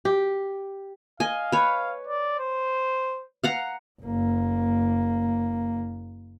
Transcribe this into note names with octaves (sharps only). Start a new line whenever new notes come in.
G4
D#5 F5 G#5
B4 C#5
D5
C5
F5 F#5 A#5
F#1 A#3